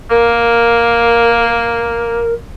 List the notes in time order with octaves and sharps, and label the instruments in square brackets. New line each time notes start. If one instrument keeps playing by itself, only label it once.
[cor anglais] A#3 [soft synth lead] A#4